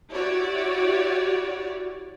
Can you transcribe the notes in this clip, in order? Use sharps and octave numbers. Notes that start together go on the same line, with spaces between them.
E4 F#4 G4 C#5 D5